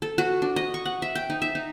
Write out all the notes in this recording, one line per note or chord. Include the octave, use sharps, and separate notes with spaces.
A4
F#4
D4
D#5
C#6
F#5
E5
G5
D#4
E5
D#4